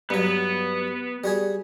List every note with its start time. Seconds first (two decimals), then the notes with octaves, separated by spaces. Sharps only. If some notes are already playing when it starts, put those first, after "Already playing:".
0.10 G2 F#3 B3 B4
1.24 G3 F#4 G#4